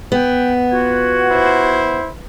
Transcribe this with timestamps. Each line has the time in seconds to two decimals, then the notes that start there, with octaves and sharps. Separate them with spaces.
0.12 B3 G5
0.70 F4 F#4 G#6
1.31 E4 C5